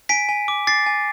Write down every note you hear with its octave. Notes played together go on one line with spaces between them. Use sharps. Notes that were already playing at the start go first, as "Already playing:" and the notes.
G#5 B6 D7
G#5
D6
D6 A6 C7
G#5